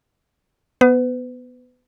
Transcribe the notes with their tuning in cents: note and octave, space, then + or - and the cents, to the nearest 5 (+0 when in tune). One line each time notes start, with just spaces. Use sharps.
B3 +0 B4 +35